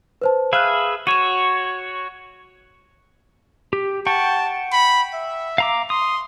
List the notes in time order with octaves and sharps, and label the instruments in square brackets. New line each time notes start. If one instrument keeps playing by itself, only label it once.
[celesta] B4 C5 A5
[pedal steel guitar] G#4 B4 E5 [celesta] F5 F6 F#6
[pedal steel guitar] F#4 C#5 [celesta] D#7 E7
[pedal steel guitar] G4
[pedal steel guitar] F#5 G5 C#6 [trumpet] A5
[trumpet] B5
E5
[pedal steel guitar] F5 A#5 D6
[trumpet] C6 [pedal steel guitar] D#6